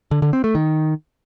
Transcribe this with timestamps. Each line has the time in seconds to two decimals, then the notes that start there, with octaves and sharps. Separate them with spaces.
0.11 D3
0.22 D3
0.33 C4
0.44 A3
0.55 D#3